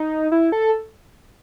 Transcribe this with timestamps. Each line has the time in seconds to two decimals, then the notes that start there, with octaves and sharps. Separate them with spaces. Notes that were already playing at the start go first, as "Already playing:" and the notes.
Already playing: D#4
0.32 E4
0.52 A4